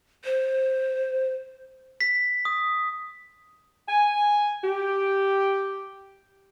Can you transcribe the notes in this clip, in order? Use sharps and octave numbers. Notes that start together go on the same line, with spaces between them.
C5
B6
D#6
G#5
G4